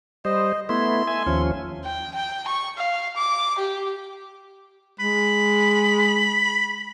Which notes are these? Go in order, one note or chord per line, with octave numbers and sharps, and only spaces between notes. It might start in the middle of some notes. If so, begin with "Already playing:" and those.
G3 C5 D#5
A3 B3 E4 C6
E5 G#5
D#2 F3 C#4
G5
G5
C#6
F5
D6
G4
G#3 B5